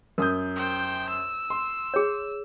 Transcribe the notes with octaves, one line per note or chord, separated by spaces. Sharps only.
F#2 A#4 D#6 G6
C5 G5
E6
C6
G#4 C#5